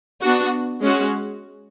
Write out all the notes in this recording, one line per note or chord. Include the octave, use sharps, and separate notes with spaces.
B3 D4 F#4
G#3 C#4 F#4